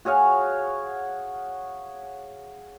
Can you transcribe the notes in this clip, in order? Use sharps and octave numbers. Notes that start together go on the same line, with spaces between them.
F#4 G#4 C#5 F5